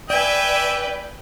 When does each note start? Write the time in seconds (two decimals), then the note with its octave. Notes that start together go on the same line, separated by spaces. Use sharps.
0.10 B4 D5 E5 G5 G#5